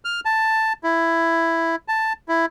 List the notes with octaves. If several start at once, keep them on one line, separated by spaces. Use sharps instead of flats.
F6
A5
E4
A5
E4